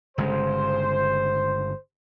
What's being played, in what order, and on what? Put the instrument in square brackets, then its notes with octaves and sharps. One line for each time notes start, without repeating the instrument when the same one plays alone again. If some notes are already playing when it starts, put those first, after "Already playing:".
[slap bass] G1 C#3 G#3 [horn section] C5